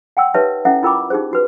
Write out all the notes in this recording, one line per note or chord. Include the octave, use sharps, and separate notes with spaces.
F#5 G5 C6 E6
D#4 G4 B4 C#5 E5 A5
C#4 E4 A4 E5 F#5
E4 F4 A#4 G5 B5 D6
D#4 G4 G#4 C5
D#4 F#4 B4